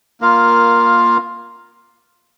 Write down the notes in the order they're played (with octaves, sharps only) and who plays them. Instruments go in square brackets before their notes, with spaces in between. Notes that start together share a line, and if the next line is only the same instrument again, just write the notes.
[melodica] A#3 F4 A#4 F5